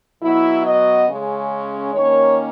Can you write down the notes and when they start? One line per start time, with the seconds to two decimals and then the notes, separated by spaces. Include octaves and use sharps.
0.23 B2 F#3 B3 E4
0.65 D#5
1.08 C#3 G#3 C#4
1.94 D#3 A#3 C#4 C#5